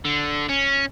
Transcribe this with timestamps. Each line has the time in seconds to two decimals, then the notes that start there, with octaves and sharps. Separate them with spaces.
0.05 D3
0.49 C#4